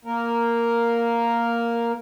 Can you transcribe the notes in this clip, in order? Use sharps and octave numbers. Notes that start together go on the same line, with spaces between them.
A#3 A#4